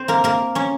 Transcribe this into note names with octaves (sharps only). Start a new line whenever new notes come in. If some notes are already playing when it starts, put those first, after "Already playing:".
Already playing: C4 C5
A#3 A#4
A#3 A#4
C#4 C#5